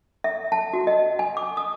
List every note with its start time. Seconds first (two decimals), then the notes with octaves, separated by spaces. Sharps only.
0.24 E5
0.52 A5
0.73 F#4
0.87 D#5
1.19 G#5
1.37 D6
1.57 D#6